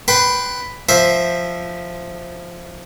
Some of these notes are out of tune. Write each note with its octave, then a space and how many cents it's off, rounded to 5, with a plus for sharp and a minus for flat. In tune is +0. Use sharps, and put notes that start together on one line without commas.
B4 +5 G5 +0 C6 -20
F3 +0 C5 +0 E5 +0